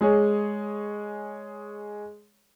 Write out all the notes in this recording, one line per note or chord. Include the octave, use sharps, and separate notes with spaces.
G#3 G#4 C#5